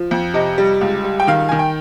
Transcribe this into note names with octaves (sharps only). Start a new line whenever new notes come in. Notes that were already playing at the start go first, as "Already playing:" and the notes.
Already playing: F3
F2
C3 D#5
G3
C#2
G3
G5
D#3 F5
D#3 G#5
G5